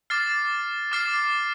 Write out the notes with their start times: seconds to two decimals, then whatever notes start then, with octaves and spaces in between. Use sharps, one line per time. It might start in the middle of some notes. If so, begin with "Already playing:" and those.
0.10 D6 F6 A6 C7
0.92 D6 F6 A6 C7